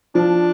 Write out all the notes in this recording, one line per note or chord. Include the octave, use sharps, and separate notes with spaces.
F3 D4